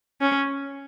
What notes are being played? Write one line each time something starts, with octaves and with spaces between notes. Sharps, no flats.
C#4